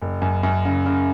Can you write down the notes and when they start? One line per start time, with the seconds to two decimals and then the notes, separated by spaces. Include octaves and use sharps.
0.02 F#1
0.22 F#2
0.43 F#2
0.65 C#3
0.86 C#3